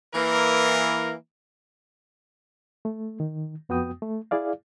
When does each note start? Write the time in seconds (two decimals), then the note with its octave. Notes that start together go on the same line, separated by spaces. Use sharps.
0.15 E3 A#3 A#4
2.85 A3
3.20 D#3
3.69 F2 B3 F#4 G5 D#6
4.02 A3
4.31 E4 G#4 D5 F5